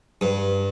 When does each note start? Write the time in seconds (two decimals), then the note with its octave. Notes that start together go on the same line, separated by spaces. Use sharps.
0.21 G2